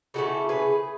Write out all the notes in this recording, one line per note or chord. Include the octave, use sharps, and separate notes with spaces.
C#3 E3 A3 F#4 A4
G#4 B4